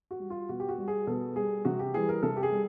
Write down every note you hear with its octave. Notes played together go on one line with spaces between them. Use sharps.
F#4
G3
F4
B2 F#4
G4
F#4
G3
G#4
B2 A4
G3 G#4
C3 F#4
G4
E3 G3 G#4
A#4
C3 A4
G4
G#4
G3